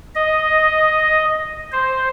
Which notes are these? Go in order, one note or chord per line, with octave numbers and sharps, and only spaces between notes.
D#5
C5